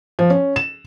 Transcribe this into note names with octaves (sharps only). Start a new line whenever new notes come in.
F3
C#4
E7